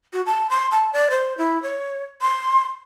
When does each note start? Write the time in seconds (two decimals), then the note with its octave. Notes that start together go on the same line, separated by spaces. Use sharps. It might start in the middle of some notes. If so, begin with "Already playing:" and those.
0.13 F#4
0.26 A5
0.50 C6
0.71 A5
0.93 D5
1.10 C5
1.38 E4
1.63 C#5
2.22 C6